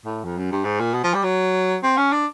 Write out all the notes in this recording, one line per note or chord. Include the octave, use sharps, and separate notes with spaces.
A2
F2
F#2
G2
G#2
A#2
B2
F3
G3
F#3
C4
C#4
D4